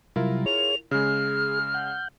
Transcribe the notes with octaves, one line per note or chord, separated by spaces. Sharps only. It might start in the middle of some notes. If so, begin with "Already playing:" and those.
C3 F#3 G3 E4 F4 A#4
G#4 C#5 F7
C#3 G#3 G#4 F6
F#5 G6